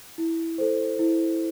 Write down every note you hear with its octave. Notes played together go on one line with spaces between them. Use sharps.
E4
A4 C5
E4